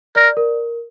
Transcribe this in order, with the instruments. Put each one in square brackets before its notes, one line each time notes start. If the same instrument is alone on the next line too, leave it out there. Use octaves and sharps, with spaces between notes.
[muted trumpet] A#4 [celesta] D5
[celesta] A#4